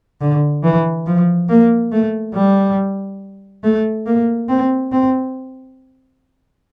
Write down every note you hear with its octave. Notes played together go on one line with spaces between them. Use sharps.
D3
E3
F3
A#3
A3
G3
A3
A#3
C4
C4